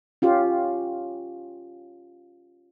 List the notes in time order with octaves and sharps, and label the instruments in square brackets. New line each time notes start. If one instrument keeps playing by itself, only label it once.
[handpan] C#4 F4 G4